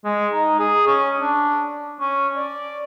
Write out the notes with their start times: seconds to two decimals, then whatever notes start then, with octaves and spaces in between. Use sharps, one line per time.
0.05 G#3
0.33 D#4
0.59 G#4
0.86 C#4
1.20 D4
2.01 C#4
2.37 D5